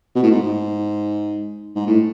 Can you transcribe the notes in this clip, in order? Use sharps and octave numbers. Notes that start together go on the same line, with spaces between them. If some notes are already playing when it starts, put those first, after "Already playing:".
B2
A2
G#2
G#2
A2